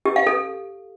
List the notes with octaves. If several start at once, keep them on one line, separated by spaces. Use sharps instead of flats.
G4
F5
A4